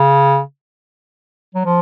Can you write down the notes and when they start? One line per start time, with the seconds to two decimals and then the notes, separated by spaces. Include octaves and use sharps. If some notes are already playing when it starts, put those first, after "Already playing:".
Already playing: C#3
1.55 F#3
1.65 F3